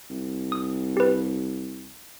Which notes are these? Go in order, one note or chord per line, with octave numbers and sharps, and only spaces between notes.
C2
D#6
G4 B4